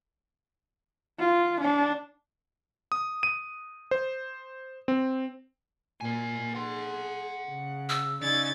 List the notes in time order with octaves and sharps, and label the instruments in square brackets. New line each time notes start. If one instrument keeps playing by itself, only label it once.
[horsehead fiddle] F4
D4
[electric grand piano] D#6
D#7
C5
C4
[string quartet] A#2 [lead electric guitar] A#4 G#5
[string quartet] G#4 [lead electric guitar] F#5 C6
[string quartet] C#3
[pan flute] E6
[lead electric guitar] C#3 C#4 [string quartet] D#4 D5 [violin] G#6 A6